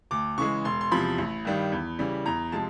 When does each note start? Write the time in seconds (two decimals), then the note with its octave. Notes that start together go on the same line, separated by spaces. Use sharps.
0.11 D2 D6
0.38 C#3 E3 G#3 C#6
0.65 E1 C6
0.81 C6
0.92 E2 C3 F3 B5
1.18 A1
1.45 G2 D#3 G3
1.72 E2
1.99 C#3 E3 G3
2.26 E2 A#5
2.52 C3 F3 G#3 A5